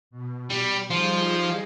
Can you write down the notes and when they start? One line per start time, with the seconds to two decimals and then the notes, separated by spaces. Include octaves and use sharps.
0.11 B2
0.50 G3
0.90 F3 G3 D#4 F4 G#4